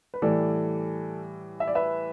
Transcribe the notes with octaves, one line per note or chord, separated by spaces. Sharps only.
B4
A2 E3 G3 A4 D5
E5
D5
B4 E5